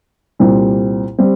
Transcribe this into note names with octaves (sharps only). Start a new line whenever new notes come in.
C2 A#2 G3 C4
G3 C4